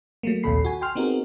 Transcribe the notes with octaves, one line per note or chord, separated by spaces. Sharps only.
F#3 A3 A#3
A#1 D#2 C3 A4 B5 C7
F#4 G#5
G5 C6 F6
B3 C4 D#4 F#4 G#4 A#4